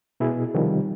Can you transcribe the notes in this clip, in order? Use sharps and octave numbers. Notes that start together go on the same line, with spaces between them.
B2 E4 G#4
C3 D#3 F3 G3